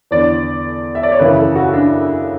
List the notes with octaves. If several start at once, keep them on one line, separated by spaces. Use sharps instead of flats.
E2 D3 D5
E5
D5
C#5
F#2 C#3 E3 B4
A4
F#4
D4